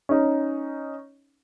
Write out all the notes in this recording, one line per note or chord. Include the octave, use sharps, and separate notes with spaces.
C#4 D#4